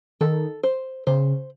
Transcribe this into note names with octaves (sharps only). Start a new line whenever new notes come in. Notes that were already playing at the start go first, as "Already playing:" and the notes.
D#3 A4
C5
C#3 C5